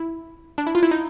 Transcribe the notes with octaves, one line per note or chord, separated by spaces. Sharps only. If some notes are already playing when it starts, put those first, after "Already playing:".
Already playing: E4
D4
E4
F4
E4
D#4